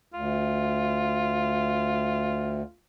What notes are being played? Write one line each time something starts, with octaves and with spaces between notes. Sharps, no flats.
D2 F4